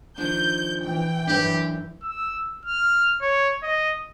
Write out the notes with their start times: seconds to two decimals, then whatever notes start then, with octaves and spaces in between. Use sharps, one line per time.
0.18 D#3 F3 D4 G6
0.84 E3 G5
1.27 F#2 E3 D4 G4 B4
2.03 E6
2.65 F6
3.21 C#5
3.63 D#5